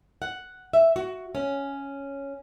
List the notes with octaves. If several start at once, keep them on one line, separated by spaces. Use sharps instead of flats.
F#5
E5
F#4
C#4